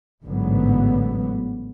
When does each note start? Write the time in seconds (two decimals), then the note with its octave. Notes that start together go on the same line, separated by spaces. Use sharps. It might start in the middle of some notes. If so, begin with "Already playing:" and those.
0.25 A1 G#2 D3 F#3 B3